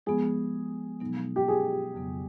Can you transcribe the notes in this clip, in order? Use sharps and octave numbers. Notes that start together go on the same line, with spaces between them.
F3 G#3 B3 G#4
B2 F#3 B3 D#4
G4
G#4
F2 C#3 F#3 B3